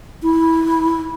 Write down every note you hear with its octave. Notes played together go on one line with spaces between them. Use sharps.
E4